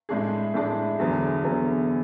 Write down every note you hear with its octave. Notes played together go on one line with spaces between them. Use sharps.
A2 G#3 D4 G#4
A2 G#3 D4 G#4
E2 D3 F#3 B3
E2 D3 F#3 B3